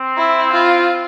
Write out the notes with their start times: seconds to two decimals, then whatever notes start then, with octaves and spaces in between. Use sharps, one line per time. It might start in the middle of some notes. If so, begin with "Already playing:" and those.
Already playing: C4
0.17 E4
0.54 F4